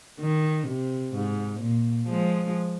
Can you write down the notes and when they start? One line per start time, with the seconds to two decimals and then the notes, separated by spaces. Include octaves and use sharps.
0.20 D#3
0.67 C3
1.14 G#2
1.61 A#2
2.08 F3 G#3